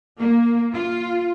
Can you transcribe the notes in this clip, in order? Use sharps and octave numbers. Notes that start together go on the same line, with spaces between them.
A#3
F4